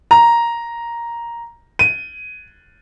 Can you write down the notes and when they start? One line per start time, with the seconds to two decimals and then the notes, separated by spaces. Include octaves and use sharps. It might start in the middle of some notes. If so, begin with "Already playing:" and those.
0.11 A#5
1.79 D#7